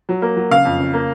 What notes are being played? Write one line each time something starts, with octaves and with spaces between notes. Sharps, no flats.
F#3
A#3
F#3
C#3 F5
F2
C#3
A#3